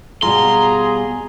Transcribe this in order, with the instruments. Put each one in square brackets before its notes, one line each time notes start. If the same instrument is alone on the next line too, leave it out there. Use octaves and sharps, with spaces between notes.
[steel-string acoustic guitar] B2 G3 F4 [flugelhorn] G#4 [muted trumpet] A#5 [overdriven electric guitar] C6